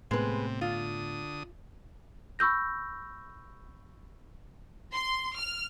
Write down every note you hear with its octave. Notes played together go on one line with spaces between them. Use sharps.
A2 C3 G#3 B3 B4
D3 F4 D#6
B5 C#6 E6 G6 A#6
C6
F6